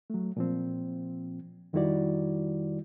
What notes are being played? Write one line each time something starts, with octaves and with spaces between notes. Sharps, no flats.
F#3 A3
A#2 F3 C4
F2 D#3 G3 E4 F#4 D5